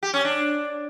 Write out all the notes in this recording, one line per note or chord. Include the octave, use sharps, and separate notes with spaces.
G4
C#4
D4